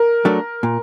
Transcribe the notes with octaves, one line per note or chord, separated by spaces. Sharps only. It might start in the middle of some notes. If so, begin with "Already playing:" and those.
Already playing: A#4
F#3 A3 D4
A#2